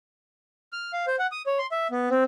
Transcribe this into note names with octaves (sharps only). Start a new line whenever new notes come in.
F6
F5
C5
F#5
D#6
C#5
C6
E5
B3
C4